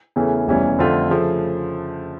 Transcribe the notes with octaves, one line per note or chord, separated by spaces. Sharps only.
E2 C#3 E3 A3 C#4
F1 E2 E3 G3 C#4
F2 D3 A3 D4 F4
C#3 F3 A3